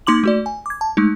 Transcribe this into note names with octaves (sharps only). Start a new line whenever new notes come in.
A#3 D#4 C6 D6 F#7
A3 F#4 D5
G#5
D6 G#6
A5
G#3 A3 D#4